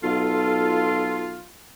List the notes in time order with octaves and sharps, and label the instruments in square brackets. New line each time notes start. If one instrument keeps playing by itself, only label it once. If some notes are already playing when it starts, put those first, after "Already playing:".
[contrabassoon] B1 [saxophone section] F4 [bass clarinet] A4